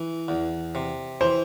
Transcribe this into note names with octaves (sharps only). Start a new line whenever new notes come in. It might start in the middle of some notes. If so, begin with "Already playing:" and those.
Already playing: E3
E2
C3
E3 C5